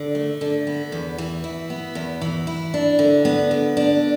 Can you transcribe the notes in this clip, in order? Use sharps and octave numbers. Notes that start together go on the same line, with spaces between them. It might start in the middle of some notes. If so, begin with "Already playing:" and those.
Already playing: D3
A3
D3
B3
E2
E3
E4
B3
E2
E3
E4
D4
D3
B3
D3
D4